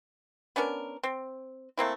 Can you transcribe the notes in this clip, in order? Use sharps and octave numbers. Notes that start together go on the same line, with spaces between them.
B3 C#4 D4 A#4
C4
A3 A#3 C4 E4